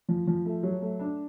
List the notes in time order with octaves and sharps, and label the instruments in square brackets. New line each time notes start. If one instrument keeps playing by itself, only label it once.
[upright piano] F3
F3
A3
F#3
A3
D4